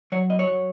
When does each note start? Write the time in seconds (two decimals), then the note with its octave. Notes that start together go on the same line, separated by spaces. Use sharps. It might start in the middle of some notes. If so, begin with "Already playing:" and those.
0.12 F#3 C#5
0.29 F#2 D#5
0.39 C#5
0.47 F#3